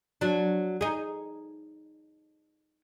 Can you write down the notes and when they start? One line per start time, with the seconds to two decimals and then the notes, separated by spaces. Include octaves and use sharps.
0.21 F#3 D4
0.81 D#4 G#4